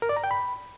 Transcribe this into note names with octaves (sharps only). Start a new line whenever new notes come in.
A#4
D5
A#5
G5
B5